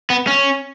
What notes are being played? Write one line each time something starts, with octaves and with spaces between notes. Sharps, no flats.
B3
C#4